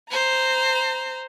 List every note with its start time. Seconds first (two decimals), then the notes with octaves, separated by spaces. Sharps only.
0.10 C5 A#5